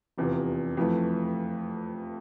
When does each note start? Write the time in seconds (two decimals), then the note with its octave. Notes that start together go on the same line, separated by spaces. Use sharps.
0.18 F1 E2 C3 F3
0.77 F2 E3 A3